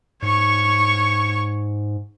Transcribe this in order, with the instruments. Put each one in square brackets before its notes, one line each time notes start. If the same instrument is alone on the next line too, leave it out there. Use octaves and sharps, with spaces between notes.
[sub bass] G#2 [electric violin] C#5 C#6